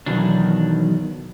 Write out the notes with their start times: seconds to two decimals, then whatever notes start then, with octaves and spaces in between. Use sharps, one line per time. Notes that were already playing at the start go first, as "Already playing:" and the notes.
0.06 B1 B2 D#3 E3 F#3 D4